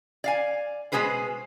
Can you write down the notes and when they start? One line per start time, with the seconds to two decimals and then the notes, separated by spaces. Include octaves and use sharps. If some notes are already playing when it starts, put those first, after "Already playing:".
0.24 D5 F5 G#5
0.92 B2 G#3 C#4 G#4 B4 C5